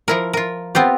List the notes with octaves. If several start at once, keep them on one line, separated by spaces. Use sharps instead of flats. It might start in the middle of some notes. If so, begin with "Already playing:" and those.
F3 E4 A#4
F4 A#4
B3 C4 F4 G4